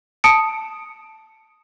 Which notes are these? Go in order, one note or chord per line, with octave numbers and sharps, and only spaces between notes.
A5 D#6 C#7 D7